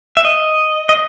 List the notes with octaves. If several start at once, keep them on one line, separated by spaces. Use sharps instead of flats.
E5
D#5
D#5